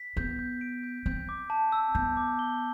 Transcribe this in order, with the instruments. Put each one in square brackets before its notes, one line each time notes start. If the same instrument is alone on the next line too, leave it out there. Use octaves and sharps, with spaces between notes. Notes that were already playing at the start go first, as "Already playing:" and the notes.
Already playing: [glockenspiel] B6
[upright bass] B3 [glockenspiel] G6
[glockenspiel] G6
D7
G6
[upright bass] C4 [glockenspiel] G6
[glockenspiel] D6
A5
E6
[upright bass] B3 [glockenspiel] G6
[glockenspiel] D6
G7